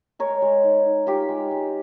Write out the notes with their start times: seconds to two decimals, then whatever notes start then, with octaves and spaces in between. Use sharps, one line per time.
0.19 G#3 A#4 C#5
0.42 G#3
0.64 D#4
0.86 D#4
1.07 F4 G4 A#4
1.29 G#3
1.51 G#3